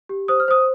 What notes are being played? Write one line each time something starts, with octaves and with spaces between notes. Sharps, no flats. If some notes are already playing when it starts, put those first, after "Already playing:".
G4
C5 D#6
F6
C5 D#6